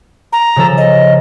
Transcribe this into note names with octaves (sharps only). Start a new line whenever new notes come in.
A#5
C#3 F3 A4
D#5